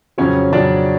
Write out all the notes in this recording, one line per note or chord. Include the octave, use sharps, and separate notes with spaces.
F2 C#3 F#3 C#4 C#5
F2 C#3 F#3 D4 D5